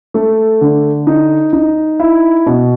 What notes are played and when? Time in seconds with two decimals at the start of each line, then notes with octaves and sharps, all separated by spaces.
0.14 A3
0.61 D3
1.07 D#4
1.53 D#4
1.99 E4
2.46 B2